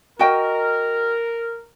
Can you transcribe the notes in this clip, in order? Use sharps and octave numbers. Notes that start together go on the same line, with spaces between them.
F#4 A#4 D#5 G5